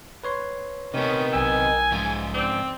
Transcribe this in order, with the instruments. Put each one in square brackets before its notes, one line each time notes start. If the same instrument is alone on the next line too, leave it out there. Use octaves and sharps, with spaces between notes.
[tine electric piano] B4 C#5 C6
[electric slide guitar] C3 B3 [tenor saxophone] D#3 [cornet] C#4
[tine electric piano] B1 D#5 E6 [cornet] G#5
[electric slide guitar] G#2 F3
[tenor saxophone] C4 [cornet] D5